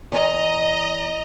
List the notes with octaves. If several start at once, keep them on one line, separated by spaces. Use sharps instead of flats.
E2 D#5 A#5